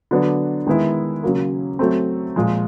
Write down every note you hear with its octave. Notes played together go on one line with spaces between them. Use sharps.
D3 F#3 B3 D4
D#3 G#3 B3 E4
C#3 F#3 A#3
F#3 A3 C4
A#2 F3 G#3